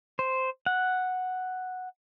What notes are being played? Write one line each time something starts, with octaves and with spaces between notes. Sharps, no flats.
C5
F#5